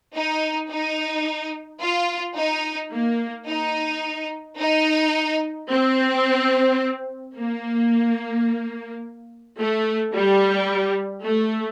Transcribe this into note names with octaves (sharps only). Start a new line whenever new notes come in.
D#4
D#4
F4
D#4
A#3
D#4
D#4
C4
A#3
A3
G3
A3